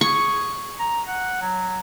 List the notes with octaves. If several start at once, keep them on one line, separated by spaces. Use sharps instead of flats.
G#4 C#6
A#5
F#5
F#3